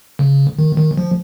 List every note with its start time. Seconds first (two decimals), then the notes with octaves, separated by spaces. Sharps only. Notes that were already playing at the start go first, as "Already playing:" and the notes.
0.19 C#3
0.59 D#3
0.77 D#3
0.97 F3